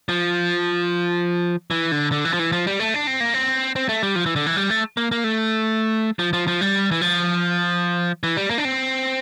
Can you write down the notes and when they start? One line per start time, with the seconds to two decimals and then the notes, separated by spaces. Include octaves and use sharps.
0.09 F3
1.71 E3
1.92 D3
2.12 D3
2.25 E3
2.33 F3
2.39 E3
2.52 F3
2.67 G3
2.80 A3
2.94 D4
3.07 C4
3.20 A#3
3.34 C4
3.76 C4
3.89 A3
4.03 G3
4.16 F3
4.26 E3
4.36 D3
4.46 E3
4.56 G3
4.70 A3
4.97 A#3
5.12 A#3
5.24 A3
6.19 F3
6.33 F3
6.47 F3
6.61 G3
6.91 E3
7.01 F3
8.23 E3
8.37 G3
8.51 A#3
8.58 D4
8.65 C4